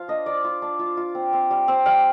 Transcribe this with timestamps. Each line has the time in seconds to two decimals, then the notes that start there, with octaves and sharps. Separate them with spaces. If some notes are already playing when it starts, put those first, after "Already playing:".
Already playing: F3 F4 F5
0.08 D4 D#5
0.26 F4 D5
0.44 F4
0.62 D4
0.79 F4
0.97 F4
1.15 C4
1.33 C4
1.51 G3
1.68 C4
1.86 G3 F5